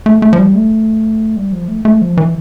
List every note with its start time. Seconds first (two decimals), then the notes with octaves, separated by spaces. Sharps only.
0.06 A3
0.22 A3
0.33 F3
0.38 G3
0.55 A3
1.37 G3
1.52 F3
1.68 A3
1.85 A3
2.01 F3
2.17 E3